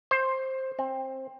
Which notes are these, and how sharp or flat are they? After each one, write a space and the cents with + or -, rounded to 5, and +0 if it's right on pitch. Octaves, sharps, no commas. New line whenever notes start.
C5 +10
C4 +20